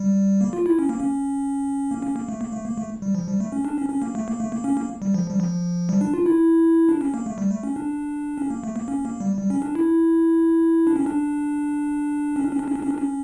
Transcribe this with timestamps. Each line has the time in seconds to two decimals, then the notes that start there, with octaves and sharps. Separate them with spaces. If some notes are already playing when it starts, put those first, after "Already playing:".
Already playing: G3
0.41 A#3
0.53 F4
0.66 E4
0.79 C#4
0.89 A#3
1.00 C#4
1.91 A#3
2.02 C#4
2.16 A#3
2.29 A3
2.41 A#3
2.52 A3
2.65 A#3
2.78 A3
3.02 G3
3.15 F3
3.28 G3
3.40 A3
3.52 C#4
3.65 D4
3.78 C#4
3.90 C#4
4.02 A#3
4.15 A3
4.28 A#3
4.40 A3
4.52 A#3
4.64 C#4
4.77 A#3
5.02 G3
5.14 F3
5.30 G3
5.40 F3
5.89 G3
6.01 D4
6.14 F4
6.26 E4
6.89 D4
7.01 C#4
7.14 A#3
7.26 A3
7.38 G3
7.51 A3
7.63 C#4
7.76 D4
8.38 C#4
8.50 A#3
8.64 A3
8.76 A#3
8.88 C#4
9.05 A#3
9.20 G3
9.38 G3
9.50 C#4
9.62 D4
9.75 E4
10.87 D4
10.96 C#4
11.06 D4
12.36 C#4
12.44 D4
12.52 C#4
12.59 D4
12.68 C#4
12.76 D4
12.82 C#4
12.91 D4
12.98 C#4